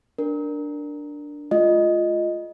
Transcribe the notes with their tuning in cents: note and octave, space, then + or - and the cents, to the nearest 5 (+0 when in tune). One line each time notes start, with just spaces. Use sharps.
D4 +0 A#4 +0
A3 -45 F4 +0 D#5 +0